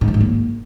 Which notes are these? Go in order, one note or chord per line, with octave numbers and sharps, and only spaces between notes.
G#2
F3
G#2
A#3